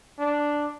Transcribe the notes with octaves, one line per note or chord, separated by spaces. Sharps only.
D4